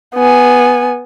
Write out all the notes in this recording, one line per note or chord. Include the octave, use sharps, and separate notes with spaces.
B3 G#5